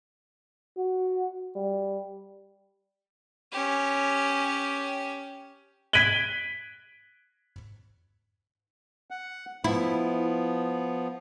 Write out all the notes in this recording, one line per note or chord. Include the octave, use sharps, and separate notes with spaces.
F#4
G3
C#4 G4
G#6 B6 D7 D#7 F#7 G7
F#5
F3 B3 E4